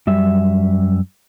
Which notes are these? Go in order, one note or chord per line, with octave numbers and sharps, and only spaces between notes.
F#2 G3 E5